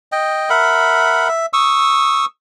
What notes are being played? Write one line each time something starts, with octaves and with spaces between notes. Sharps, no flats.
D#5 G5
A#4 E5 F#5 B5
E5
C#6 D#6 E6